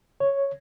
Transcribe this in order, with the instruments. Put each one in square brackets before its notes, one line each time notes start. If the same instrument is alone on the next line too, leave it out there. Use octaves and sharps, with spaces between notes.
[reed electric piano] C#5